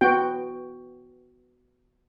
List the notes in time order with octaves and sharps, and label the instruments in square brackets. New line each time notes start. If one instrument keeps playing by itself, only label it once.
[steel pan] B3 F#4 G5